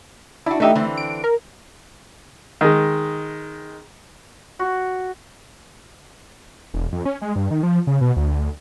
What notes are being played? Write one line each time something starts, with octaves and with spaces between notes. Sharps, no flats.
D4 E4 F#4
E3 A3 D#4 G4 E5
D3 E3 C4
D7
A#4
D#3 G#3
F#4
E1
F2
C#4
G#3
G2
D#3
F3
C#3
B2
D2